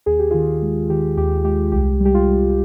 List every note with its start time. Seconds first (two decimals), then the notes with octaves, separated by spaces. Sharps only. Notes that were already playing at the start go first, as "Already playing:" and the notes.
0.06 D#2 G#4
0.19 G4
0.31 D#3 F4 G#4
0.62 G#3
0.90 D#3 G4
1.17 D#2 G4
1.44 G#3 G4
1.72 C2 G4
2.00 G3
2.05 G4
2.14 F4
2.28 G3
2.49 F4